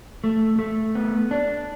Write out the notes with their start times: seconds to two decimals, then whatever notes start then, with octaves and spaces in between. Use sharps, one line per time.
0.24 A3
0.59 A3
0.95 B3
1.31 D4